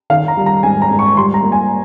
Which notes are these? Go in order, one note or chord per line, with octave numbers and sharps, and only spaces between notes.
D#3 F5
A#5
G3
A#5
G#2 G#5
A#5
G#2
C#6
G3 C6
A#5
A#3
G#5